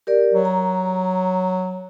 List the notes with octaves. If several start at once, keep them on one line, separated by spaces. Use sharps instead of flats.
G4 A#4 D5
F#3
A#5